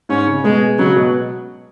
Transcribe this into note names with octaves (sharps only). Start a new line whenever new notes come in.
G#2 C#4
C#3
B2 G#3
C#3 F#3
B2